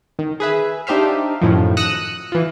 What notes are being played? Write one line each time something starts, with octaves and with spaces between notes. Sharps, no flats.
D#3
G#4 B4 E5
D4 D#4 G4 C5 E5 F5
F#2 A2 D#3 F3
D#6 E6 F#6 A#6 C#7 D#7
E3 F4